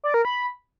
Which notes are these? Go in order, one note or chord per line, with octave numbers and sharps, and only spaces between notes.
D5
A#4
B5